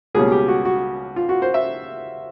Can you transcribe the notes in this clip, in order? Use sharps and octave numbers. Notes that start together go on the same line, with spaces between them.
C#2 B2 G3 A#3 C#4 G#4
G4
F#4
F#4
F4
F#4
C5
E5